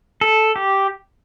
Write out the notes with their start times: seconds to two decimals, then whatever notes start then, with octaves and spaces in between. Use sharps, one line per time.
0.21 A4
0.56 G4